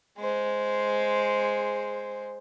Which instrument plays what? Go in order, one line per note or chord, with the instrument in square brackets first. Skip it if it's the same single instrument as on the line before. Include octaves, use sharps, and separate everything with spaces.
[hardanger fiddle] G#3 C5